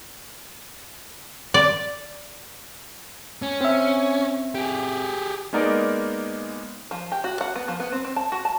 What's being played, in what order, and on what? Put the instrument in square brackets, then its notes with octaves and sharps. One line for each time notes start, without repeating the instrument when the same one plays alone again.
[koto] D5
[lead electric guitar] C#4
[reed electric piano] C4 E5
[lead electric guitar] G4 G#4
[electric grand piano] G#3 A#3 B3 D#4 A#4 D5
[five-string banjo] F3
G4
F#4
F#5
B3
F3
B3
C4
C4
A5
F#4
A5